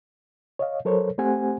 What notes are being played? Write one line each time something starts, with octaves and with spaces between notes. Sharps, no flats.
C#5 D#5 F5
F#3 A4 A#4 C5 C#5
A3 C4 G4 C5 F#5 G#5